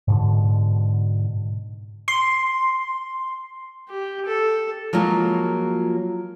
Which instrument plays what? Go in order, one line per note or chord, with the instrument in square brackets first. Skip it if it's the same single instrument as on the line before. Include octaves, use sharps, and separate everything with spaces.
[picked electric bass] G#2 B2 D3
[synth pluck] C6
[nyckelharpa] G4
A4
[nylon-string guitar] F3 F#3 G#3 A#3 F4 F#4